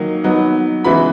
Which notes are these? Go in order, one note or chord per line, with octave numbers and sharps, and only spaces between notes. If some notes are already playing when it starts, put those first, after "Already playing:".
Already playing: D#3 F#3 A#3 D#4
F#3 B3 D#4
C#3 E3 G#3 B3 E4 B5